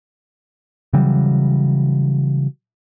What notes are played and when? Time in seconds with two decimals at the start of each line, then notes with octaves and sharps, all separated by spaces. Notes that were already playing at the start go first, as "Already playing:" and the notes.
0.93 C#3 E3 F#3 G3